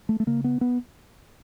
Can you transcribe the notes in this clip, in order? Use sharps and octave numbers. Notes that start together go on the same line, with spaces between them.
A3
A3
C#3 A#3
B3
B3